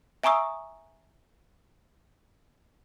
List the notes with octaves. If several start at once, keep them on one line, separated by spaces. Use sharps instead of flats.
E5 G#5 A#5 C#6 D#6 E6